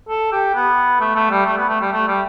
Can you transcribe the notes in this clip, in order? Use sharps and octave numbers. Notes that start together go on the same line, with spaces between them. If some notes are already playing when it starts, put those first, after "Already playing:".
A4
G4
B3
A3
A3
G3
A3
B3
A3
G3
A3
G3